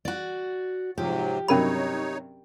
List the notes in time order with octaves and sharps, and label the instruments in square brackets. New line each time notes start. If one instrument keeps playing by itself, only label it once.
[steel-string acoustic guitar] F#4 D5
[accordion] G#2 C3 F#3 [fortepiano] F3 [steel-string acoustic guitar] G4
[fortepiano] G2 C3 F#3 [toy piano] C#4 A#4 B5 [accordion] D#4 C#5